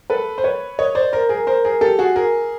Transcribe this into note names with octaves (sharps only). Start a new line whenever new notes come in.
A4 B4
C5
B4 C#5
C#5 D#5
C5 D5
A#4 C5
G#4 A#4
A#4 C5
G#4 A#4
G4 A4
F#4 G#4
G#4 A#4